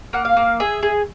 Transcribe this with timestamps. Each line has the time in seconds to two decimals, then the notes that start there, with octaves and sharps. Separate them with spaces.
0.13 A#3 F#5
0.25 F5
0.37 A#3
0.60 G#4 E5
0.83 G#4